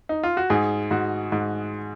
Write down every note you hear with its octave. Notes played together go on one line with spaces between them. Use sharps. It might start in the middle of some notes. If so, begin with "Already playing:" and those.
D#4
F4
F#4
G#2 G#4
G#2 F#4
G#2